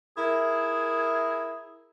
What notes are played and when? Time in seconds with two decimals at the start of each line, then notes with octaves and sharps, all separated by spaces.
0.17 E4 G#4 A#4